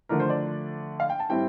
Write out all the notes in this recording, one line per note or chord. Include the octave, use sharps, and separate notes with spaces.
D3 F3 A3 D4 A#4
C5
D5
F5
G5
A5
A2 G3 C4 E4 G5